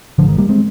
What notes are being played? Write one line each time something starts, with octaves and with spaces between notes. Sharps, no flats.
G#1 G#2 D3 F3
D#3
G3 A#3
G#3 C4